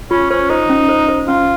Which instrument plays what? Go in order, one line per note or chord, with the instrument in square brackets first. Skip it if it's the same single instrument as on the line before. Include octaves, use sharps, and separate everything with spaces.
[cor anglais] C#4 [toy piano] F4
[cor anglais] C#4 [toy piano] C5
[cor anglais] D#4 [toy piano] C5
[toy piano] C#4
C5
C5
[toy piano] C#4 [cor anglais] F4